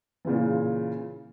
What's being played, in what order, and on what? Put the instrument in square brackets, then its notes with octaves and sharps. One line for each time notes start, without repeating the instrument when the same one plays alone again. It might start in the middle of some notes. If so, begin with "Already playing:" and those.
[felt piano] A#2 C#3 E3